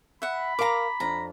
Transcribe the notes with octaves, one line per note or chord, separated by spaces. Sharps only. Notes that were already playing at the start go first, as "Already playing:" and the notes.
E5 F#5 B5
A#4 F5 A#5 D6
F2 D4 A#5